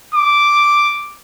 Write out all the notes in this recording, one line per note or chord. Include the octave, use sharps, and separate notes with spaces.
D6